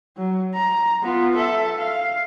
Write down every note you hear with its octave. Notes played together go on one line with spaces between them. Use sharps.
F#3
A#5
B3 F4
A4 E5
F5